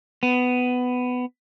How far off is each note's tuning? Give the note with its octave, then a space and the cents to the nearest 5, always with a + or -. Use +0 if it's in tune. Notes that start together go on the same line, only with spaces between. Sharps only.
B3 +15